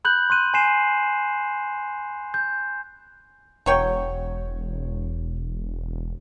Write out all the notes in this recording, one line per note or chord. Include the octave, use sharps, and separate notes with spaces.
B5 F#6 G6 F#7
C6 F#6 D#7
G#5 C6 C7 E7
G6
E1 F#3 C#5 G5